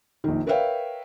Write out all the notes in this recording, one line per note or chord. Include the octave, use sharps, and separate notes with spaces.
A#1 D#3
A#4 B4 C#5 E5 F5 G5